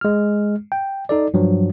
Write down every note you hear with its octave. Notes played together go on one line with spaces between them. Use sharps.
G#3 F6
G5
D#4 A4 D5
G2 F3 F#3